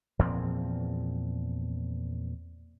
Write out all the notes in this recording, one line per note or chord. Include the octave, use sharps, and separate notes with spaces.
E2 A#2 F3 C4